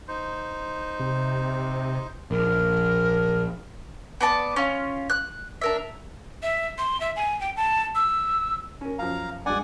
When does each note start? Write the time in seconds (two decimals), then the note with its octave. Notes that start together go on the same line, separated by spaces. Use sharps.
0.08 D#4 C5
0.99 C3
2.31 A#1 A#4
4.21 B3 D5 A5
4.56 C#4 F4
5.10 F#6
5.61 D4 A#4 E5
6.43 E5
6.78 C6
7.00 E5
7.16 G#5
7.41 G5
7.57 A5
7.95 E6
8.81 C#4 A#4
8.99 F#2 F3 F5 A#5
9.46 G2 G#3 D5 F#5 G#5